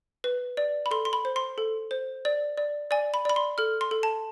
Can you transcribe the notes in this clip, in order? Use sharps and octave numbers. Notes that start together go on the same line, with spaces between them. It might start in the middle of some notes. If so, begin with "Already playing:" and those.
B4
D5
B5
A4 C6
C6
B5
C5
C6
A4
C5
D5
D5
D5 G#5
B5
D5 B5
C6
A4 F6
C6
A4
A5